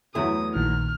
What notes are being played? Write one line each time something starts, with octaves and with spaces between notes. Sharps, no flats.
E2 F#3 A3 E4 D#6
A#1 A#2 D#3 F6